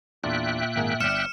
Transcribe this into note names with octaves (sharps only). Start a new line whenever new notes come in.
E2 A#2 D4 F4 E5 G5 F#6
G#1 A#3 G#4
G1 D5 F6 C#7 E7